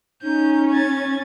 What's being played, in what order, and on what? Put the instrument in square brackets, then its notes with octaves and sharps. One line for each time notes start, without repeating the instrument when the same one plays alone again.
[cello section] C#4 [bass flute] D#4 [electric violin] G6
[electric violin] G#6 A6